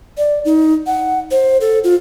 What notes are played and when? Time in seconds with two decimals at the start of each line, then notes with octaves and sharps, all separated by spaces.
0.18 D5
0.45 D#4
0.87 F#5
1.31 C5
1.61 A4
1.84 F4